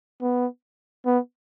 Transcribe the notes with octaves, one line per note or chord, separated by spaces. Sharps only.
B3
B3